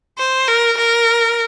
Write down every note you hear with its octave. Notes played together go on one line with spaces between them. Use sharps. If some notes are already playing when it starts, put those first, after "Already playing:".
C5
A#4
A#4